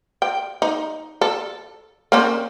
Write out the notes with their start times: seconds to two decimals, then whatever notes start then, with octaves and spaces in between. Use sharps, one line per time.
0.22 G5
0.62 D#4
1.21 A4
2.12 A#3 C4 C#4